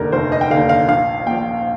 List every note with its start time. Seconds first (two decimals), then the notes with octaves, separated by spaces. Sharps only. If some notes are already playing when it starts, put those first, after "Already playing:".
Already playing: F1 D#2 D3 A#4
0.12 F1 C5
0.32 D#5
0.41 G5
0.50 D#2 D3 F5
0.69 F5
0.88 A#1 F5
1.26 A#2 F3 G5